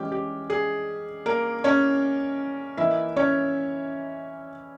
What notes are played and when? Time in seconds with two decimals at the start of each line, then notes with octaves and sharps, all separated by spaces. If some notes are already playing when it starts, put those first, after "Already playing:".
Already playing: E3 G#3 C#4 G4
0.12 G4
0.50 G#4
1.26 A#3 A#4
1.64 C#4 C#5
2.77 E3 A#3 D#4 E4 E5
3.16 C#4 C#5